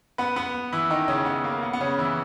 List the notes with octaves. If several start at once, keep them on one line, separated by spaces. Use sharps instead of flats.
B3 B4
B3 B4
E3 E4
D#3 D#4
C#3 C#4
B3
A#3
B3
B3
C#3 C#4
E3 E4